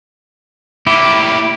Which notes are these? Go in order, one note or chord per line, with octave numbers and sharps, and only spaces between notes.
A2 A#3 E4 G4